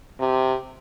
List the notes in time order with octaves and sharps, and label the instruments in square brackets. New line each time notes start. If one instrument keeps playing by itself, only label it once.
[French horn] C3